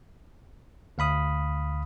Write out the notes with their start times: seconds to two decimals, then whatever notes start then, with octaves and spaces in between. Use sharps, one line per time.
0.98 D2 F5 B5 D#6